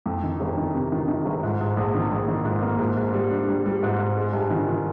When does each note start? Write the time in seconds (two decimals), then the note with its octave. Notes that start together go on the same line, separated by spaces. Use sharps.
0.06 F2
0.23 D#3
0.40 G1
0.57 D#3
0.74 C3
0.92 D#3
1.08 D#3
1.25 G1
1.43 G#2
1.61 G#2
1.77 A#1
1.95 D#3
2.12 A#1
2.28 D#3
2.45 G#2
2.62 A#3
2.79 G#2
2.97 G#2
3.14 G3
3.31 D4
3.48 G3
3.66 G3
3.83 G#2
3.99 G#2
4.17 G#3
4.33 G2
4.50 D#3
4.68 D#3